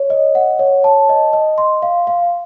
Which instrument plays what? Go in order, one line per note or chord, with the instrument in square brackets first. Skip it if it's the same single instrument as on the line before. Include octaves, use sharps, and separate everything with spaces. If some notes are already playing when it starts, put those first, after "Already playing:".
Already playing: [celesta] C#5
D#5
F#5
C#5
A5
D#5
D#5
C6
F5
F5